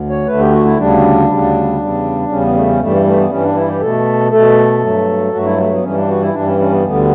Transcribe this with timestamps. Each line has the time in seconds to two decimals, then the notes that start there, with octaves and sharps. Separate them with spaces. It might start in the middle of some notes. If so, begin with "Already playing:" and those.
Already playing: D2
0.10 C#5
0.26 D2 D3 A3 B4
0.40 G4
0.51 F#4
0.65 E4
0.77 D2 C#3 G3 D4
1.27 D2 C#3 G3
1.78 E2 C#3 G3
2.28 E2 C#3 G3 C#4
2.42 B3
2.54 A3
2.67 C#4
2.79 G2 E3 G3 A3
3.05 A3
3.17 B3
3.30 G2 E3 G3 C#4
3.43 D4
3.55 E4
3.68 G4
3.80 B2 A3 A4
4.31 B2 A3 A4
4.82 G2 F#3 A3
5.33 G2 F#3 A3 F#4
5.45 E4
5.58 A3
5.71 B3
5.83 G2 E3 G3 C#4
5.96 D4
6.08 F#4
6.21 E4
6.33 G2 E3 G3 D4
6.47 C#4
6.59 C#4
6.71 B3
6.85 D2 D3 G3 B3